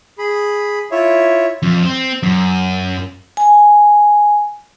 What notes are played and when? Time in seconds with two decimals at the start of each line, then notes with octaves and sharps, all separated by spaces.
0.18 G#4 B5
0.91 E4 F4 C#5 E5
1.63 F2
1.84 C4
2.23 F#2
3.37 G#5